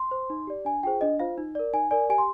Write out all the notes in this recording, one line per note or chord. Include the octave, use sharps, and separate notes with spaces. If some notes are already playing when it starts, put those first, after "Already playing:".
Already playing: C6
C5
D#4
G4 D5
D4 G#5
F4 G#4 C5 G5
D4 D#5
F4 C5 F5
D#4
A#4 D5
D#4 G#5
A#4 D5 G#5
G4 G#5
C6